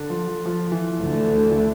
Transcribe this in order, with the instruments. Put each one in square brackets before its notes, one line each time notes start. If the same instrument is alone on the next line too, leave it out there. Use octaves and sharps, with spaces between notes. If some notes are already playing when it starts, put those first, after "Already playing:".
Already playing: [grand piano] D3 D4
F3 F4
F3 F4
F3 F4
F4
E3 E4
[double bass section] D2 D3 A3
[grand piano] E3 E4